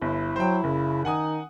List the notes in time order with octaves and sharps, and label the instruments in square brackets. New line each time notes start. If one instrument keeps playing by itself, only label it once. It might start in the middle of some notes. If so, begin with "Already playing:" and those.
[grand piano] G1 [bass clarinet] E4
[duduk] F#3 [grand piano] C5 G5
[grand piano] F#1 [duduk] C#3
[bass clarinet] D#3 [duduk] D#4 [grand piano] F#5 G#5 D#6